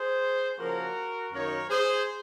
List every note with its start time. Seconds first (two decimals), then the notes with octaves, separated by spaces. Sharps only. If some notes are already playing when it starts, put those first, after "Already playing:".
Already playing: G#4 C5
0.58 C#3 F3 A#3 C#4 F#4 A#4
1.33 F#2 D#3 A#3 D#4 A#4 C#5
1.70 G#4 C5